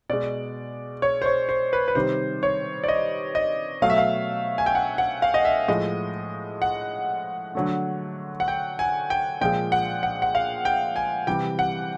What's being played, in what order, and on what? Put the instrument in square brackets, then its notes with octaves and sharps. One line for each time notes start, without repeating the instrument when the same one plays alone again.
[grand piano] B2 G#3 D5
C#5
C5
C#5
C5
B4
B4
C3 D#3 G3 C5
C#5
D5
D#5
D#5
B2 F#3 A3 F5
E5
F5
G#5
G5
F#5
F#5
F5
D#5
E5
A2 F3 G#3 D#5
F#5
D3 F#3 A3
F#5
G5
G#5
G5
A#2 F3 G#3 G5
F#5
F#5
F#5
F5
G5
G#5
C3 E3 G3 G5
F#5